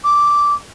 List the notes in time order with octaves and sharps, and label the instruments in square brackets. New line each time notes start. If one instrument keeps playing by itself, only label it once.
[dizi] D6